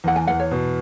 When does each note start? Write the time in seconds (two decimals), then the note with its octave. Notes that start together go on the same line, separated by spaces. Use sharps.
0.04 E2 F#5
0.16 G#5
0.27 E2 F#5
0.40 C#5
0.51 B2